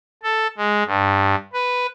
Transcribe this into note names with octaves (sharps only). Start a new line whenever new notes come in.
A4
G#3
G2
B4